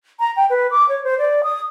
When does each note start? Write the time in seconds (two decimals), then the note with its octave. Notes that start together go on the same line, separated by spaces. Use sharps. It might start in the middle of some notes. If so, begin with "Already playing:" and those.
0.20 A#5
0.36 G5
0.50 B4
0.71 D6
0.89 C#5
1.04 C5
1.18 D5
1.44 D#6